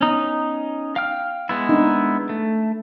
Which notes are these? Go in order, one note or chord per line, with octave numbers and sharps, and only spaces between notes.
B3 C#4 D#4
F5 G5 F6
G#3 B3 E4
C4 D4 D#4
A3